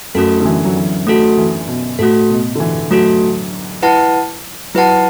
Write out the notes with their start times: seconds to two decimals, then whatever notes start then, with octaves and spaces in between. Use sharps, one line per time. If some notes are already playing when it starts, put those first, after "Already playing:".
0.15 F#2 A3 F#4 A4
0.40 D3
0.45 E3
0.65 F#3
0.76 E3
1.07 F#3 A3 F#4 A4
1.37 E3
1.68 B2
1.99 A2 A3 F#4 A4
2.30 B2
2.56 D3
2.60 E3
2.90 F#3 A3 F#4 A4
3.83 E4 B4 F#5 A5
4.74 F#3 E4 B4 F#5 A5